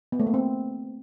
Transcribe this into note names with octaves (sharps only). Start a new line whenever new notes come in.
B3
A3
A#3
C4